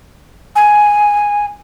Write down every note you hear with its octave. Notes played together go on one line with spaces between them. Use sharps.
G#5